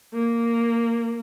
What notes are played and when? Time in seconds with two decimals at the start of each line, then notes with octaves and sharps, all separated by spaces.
0.14 A#3